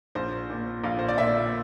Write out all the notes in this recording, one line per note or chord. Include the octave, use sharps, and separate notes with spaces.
A#1 C5
A#2
A#1 F5
C5
D5
A#2 E5